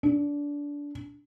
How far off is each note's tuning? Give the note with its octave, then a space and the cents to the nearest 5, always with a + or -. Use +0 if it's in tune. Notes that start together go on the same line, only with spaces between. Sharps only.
D4 -20